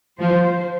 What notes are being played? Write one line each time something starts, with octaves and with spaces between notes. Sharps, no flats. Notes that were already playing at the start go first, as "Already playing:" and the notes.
F3 C5